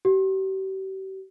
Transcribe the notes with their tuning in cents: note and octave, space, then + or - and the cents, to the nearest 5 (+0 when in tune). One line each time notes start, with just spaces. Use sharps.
G4 -40